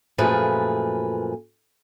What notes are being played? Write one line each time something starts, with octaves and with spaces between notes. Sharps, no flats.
F#2 A#2 F3 A3 G#4 B4